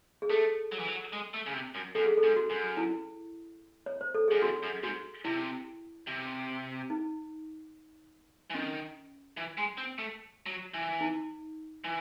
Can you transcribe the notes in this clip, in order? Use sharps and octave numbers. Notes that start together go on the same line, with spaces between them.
G#4
A3 A4
F#3
E3
F#3
G#3
A3
C#3
C3
F#2
F#2 A4
G#4
A4
G#2
F#4
F#2
E4
C#5
C5
A4
F#2 G#4
E2 F#4
F#2
G#2 F#4
C3 E4
C3
D#4
E3
D#3 C#4
E3
G#3
C4
A3
F#3
E3
D#4
E3